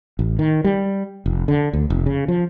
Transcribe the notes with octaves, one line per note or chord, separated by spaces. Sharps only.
A1
D#3
G3
F1
D3
D2
F1
C#3
F3